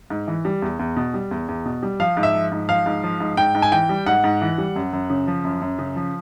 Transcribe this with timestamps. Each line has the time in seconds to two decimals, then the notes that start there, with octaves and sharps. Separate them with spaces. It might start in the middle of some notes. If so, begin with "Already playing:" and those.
0.10 G#2
0.28 E3
0.45 G3
0.62 E2
0.79 E2
0.96 B2
1.14 G3
1.31 E2
1.49 E2
1.65 B2
1.83 G3
2.00 F3 F5
2.17 G#2
2.23 E5
2.34 F3
2.52 G#2
2.69 F3 F5
2.86 G#2
3.03 F3
3.20 G#2
3.37 G#2 G5
3.55 G#2
3.62 G#5
3.72 E3 G5
3.89 G3
4.06 G#2 F#5
4.24 G#2
4.42 E3
4.58 G3
4.76 F#2
4.93 F#2
5.10 C#3
5.27 F3
5.44 F#2
5.62 F#2
5.79 C#3
5.96 F3